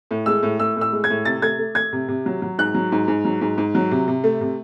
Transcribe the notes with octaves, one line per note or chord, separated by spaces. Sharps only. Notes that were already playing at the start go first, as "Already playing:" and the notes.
A2
G#3 E6
A2
A2 E6
A2 E6
G#3
G#6
A2
C3 A6
A3 G#6
A3
A3 G#6
C3
C3
F#3
F#3
G#2 F#6
F#3
G#2
G#2
F#3
G#2
G#2
F#3
C3
C3
A3
C3